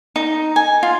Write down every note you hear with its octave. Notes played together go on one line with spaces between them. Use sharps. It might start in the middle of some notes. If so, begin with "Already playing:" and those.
D#4
G#5
F4